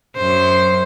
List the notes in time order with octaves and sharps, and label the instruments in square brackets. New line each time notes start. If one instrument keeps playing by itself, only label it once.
[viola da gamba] F#2 C5